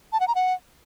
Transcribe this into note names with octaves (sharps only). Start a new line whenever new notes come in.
A5
F#5
A#5
F#5